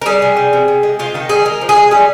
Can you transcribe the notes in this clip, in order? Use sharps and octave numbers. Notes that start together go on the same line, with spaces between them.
A#4
G3 G#4
C3
G3
C3
C3
G#3
C3 F4
D#3 D#4
G3 G#4
G#3 A#4
F3
G#4
G#3
G3 G#4